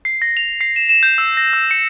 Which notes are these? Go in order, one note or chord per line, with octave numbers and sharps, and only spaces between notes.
C7
A#6
F7
C7
E7
E7
G6
E6
A#6
E6
C#7